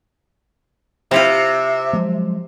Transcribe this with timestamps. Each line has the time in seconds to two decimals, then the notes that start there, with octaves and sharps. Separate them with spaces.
1.11 C3 C4 E4 F4 E5
1.93 F3 F#3 G#3